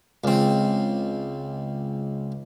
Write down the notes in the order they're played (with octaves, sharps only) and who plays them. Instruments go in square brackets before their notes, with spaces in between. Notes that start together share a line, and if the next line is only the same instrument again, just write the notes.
[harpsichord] C#2 C4